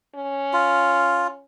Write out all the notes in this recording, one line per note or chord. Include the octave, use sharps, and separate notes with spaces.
C#4
F4